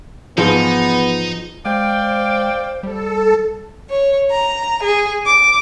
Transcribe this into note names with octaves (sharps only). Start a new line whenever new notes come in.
G#2 E3 F3 G#3 B3 D#4
G#3 C5 D5 F5 G5
G3 A4
C#5
A#5
G#4
D6